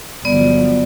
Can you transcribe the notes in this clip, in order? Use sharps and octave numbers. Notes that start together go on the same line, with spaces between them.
G1 F3 F#3 B3 D5